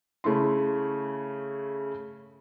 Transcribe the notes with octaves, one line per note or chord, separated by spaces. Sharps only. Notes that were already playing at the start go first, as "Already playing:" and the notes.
C#3 A3 E4 C6